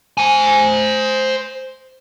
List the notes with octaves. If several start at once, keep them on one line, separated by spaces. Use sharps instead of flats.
C5 G#5